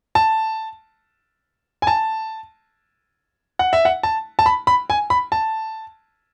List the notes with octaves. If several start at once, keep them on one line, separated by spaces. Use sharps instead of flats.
A5
G#5
A5
F#5
E5
F#5
A5
A5
B5
B5
G#5
B5
A5